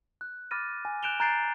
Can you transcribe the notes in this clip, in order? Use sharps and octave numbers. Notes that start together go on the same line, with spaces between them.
F#6
B5 D6 F6 A6 A#6 D#7
G#5
F#6 G6 D7 E7 F7 G7
A#5 F#6 G6 A6 C7 D7